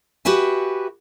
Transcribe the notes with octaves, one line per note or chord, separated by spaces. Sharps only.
F#4 G4 B4 E5 G#5